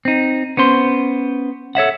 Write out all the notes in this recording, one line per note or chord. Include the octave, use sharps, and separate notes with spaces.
C4 D#4
B3 C#4 C5 C6
A4 C#5 E5 F#5